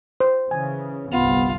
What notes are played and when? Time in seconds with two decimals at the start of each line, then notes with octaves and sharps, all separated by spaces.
0.20 C5
0.51 C#3 E3 G#5
1.12 G1 C2 B3 F4